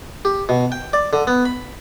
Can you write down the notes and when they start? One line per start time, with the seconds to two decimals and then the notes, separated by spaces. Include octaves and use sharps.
0.25 G4
0.49 B2
0.72 G5
0.93 D5
1.13 D3
1.27 B3
1.45 B5